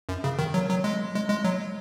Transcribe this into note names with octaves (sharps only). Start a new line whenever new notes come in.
F#2
C#3
D#3
F#3
F#3
G#3
G#3
G#3
F#3